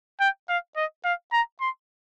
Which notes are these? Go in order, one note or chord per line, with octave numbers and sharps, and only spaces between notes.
G5
F5
D#5
F5
A#5
C6